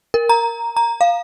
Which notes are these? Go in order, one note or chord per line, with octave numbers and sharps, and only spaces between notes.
A#4
A#5
A#5
F5